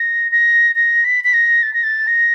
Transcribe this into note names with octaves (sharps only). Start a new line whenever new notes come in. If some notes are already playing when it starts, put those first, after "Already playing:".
Already playing: A#6
A#6
A#6
B6
B6
A#6
A6
A#6
A6
A#6